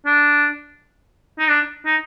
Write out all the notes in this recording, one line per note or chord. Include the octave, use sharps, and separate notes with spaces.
D4
D#4
D4
D#4